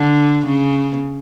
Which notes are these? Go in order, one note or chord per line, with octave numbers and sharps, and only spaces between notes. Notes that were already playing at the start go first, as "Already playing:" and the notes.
Already playing: D3
C#3